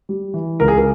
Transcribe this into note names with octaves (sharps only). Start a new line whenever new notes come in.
G3
E3
C#2 A#4
G#4
A#4